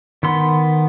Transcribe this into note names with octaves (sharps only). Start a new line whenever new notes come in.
D#3 B3 C6